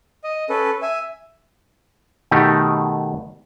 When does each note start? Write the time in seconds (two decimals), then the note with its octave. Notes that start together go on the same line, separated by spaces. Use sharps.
0.24 D#5
0.49 C#4 A4 B4
0.82 E5 G#5
2.31 B2 D#3 A3 D#4 G4